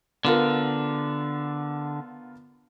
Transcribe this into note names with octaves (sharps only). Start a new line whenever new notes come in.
D3 B3 F4 A#4